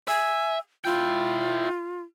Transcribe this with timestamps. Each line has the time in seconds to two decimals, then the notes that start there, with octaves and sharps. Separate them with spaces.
0.08 E5 G#5
0.85 E4 F4 G5